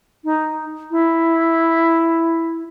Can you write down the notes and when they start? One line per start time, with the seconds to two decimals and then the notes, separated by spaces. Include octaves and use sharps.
0.24 D#4
0.91 E4